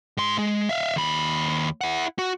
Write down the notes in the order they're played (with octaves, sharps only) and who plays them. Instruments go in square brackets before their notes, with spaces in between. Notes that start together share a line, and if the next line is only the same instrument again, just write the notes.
[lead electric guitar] G#2 C6
G#3
E5 F5
D#2 B5
E4 F#5
F#4